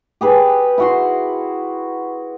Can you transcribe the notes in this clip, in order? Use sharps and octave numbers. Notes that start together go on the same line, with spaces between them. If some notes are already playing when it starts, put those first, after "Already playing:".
G4 G#4 B4
E4 F#4 C6